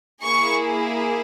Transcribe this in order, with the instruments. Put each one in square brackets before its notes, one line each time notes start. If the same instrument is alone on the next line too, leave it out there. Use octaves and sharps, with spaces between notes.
[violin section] A#3 E4 G#4 C#6